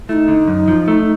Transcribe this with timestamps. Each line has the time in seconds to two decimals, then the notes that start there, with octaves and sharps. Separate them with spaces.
0.09 A3 D#4 E4
0.28 D3
0.48 F#2
0.68 F3
0.88 A3